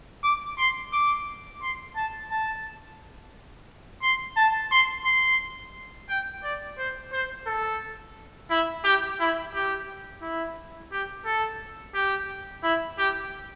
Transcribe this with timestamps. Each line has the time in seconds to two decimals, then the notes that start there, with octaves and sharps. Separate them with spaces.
0.24 D6
0.58 C6
0.93 D6
1.62 C6
1.96 A5
2.31 A5
4.03 C6
4.37 A5
4.72 C6
5.05 C6
6.09 G5
6.44 D5
6.78 C5
7.12 C5
7.47 A4
8.50 E4
8.84 G4
9.20 E4
9.54 G4
10.22 E4
10.92 G4
11.26 A4
11.94 G4
12.63 E4
12.98 G4